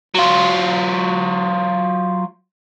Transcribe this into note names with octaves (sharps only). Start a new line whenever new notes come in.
F#3 F4